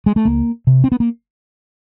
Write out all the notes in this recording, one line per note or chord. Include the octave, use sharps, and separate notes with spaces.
G#3
A3
C#2 A#3
C3
C4
B3
A#3